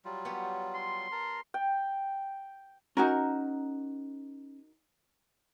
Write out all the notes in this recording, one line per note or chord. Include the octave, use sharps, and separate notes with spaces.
F#3 G3 F4
B3 G4 C#5
C6
A#4 A5 A#5
G5
C#4 D#4 F#4 A#4 G#5